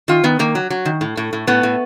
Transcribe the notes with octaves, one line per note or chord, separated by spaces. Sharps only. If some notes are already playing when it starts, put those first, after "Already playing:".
D#3 F4
D#3 B3
D#3 A#3
F#3
F#3
D#3
A2
A2
A2
A2 B3
A2